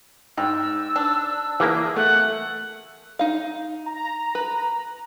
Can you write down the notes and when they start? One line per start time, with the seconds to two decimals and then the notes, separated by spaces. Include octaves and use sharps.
0.37 G#2 G3 E6
0.96 D4
1.60 E3 A#3 G#4
1.96 A3 F#5
3.19 D#4 F5
3.86 A#5
4.35 B4